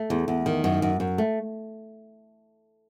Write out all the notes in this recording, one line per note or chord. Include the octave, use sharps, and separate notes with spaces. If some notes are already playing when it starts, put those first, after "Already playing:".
Already playing: A3
E2
E2
D#3
F#2
F#2
F#2
A3